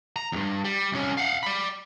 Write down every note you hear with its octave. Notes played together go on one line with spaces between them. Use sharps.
A#5
E2 G2
G3
C2 C#4
F5 F#5
D5 B5